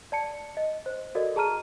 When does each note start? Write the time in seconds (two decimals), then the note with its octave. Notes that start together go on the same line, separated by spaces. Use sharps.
0.12 D5 A5 C#7
0.57 D#5
0.86 C5
1.15 F#4 A4 A#4 D5 D#5
1.36 G#4 A5 A#5 F6 D#7